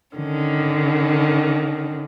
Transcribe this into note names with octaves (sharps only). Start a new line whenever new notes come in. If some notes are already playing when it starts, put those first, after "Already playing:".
D3 D#3 C#4